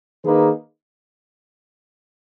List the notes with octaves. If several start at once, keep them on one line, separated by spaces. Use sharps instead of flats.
D#3 A#3 D#4 G#4 B4